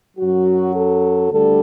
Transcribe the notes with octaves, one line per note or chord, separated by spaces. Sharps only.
F#2 F#3 F#4
A4
D2 D3 G3 A4